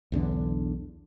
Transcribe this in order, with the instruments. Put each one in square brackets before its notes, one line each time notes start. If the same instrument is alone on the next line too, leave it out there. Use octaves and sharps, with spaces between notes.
[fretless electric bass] B1 E2 D3 D4